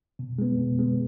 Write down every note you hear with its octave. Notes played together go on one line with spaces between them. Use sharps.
B2
G#3 B3
B2
G#3 B3